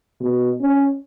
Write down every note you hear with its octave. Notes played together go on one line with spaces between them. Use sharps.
B2
C#4